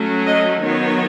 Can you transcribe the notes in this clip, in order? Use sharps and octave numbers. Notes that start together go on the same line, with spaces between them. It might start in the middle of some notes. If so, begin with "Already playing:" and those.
Already playing: F#3 A3 C#4
D#5
D#3 F#3 B3 C#5